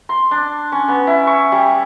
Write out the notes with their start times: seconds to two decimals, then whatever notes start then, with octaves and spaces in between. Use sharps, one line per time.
0.09 C6
0.31 D4
0.72 C#4
0.88 B3
1.07 E4
1.27 C#6
1.52 G3